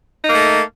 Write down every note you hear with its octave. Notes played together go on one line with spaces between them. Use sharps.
A3 A#3 D#4